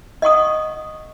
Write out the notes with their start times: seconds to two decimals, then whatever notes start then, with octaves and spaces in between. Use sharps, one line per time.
0.22 D#5 F#5 C#6 D#6